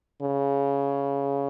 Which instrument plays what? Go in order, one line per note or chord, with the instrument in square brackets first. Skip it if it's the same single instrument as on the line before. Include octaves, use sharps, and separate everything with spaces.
[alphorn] C#3